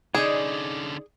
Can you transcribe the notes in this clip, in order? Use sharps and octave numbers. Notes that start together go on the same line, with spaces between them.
D3 C#4 D#4 G#4 D5